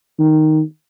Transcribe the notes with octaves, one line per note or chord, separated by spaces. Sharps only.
D#3